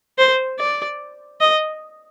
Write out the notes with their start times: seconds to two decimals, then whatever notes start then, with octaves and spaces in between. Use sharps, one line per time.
0.18 C5
0.59 D5
1.40 D#5